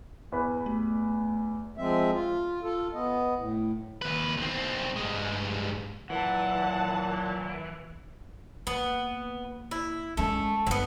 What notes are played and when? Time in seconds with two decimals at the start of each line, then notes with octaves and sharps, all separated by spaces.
0.32 E2 B4 B5
0.66 A3
1.78 F3 G#3 C4 E5
2.13 F4
2.62 F4 A4
2.93 B3 D#5
3.36 A2
4.02 D#2 B4
4.37 B1 C4
4.96 G2 G#3
6.10 A#2 E3 F#3 F#5 A5
8.67 A#3 B3
9.71 E4
10.17 G#3 A3 C#4
10.67 G1 B3 C4